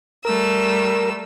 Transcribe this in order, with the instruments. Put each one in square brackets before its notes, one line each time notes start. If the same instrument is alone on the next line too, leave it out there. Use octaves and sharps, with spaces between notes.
[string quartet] G3 A3 E6 [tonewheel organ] A#4